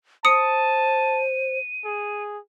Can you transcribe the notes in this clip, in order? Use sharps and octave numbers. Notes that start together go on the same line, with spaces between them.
C5 A5 D#6 C#7 D#7
G#4